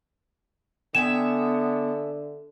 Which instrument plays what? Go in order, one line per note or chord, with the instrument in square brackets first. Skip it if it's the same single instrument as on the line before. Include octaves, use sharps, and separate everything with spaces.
[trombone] D3 [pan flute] B3 [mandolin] E5 G5 G#5 [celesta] E7